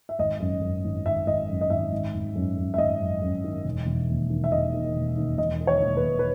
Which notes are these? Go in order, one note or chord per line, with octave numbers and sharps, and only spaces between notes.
E5
G#1 D#5
F#2
F#2
G#1
G#1 E5
G#1 D#5
F#2
D#5
G#1 E5
G#1
G#1
F#2
F#2
E5
G#1 D#5
F#2
F#2
D#3
E1
E1
D#2
D#3
E5
E1 D#5
D#3
E1
D#2
E1 D#5
D#3
C#5
E1
B4
E1
B4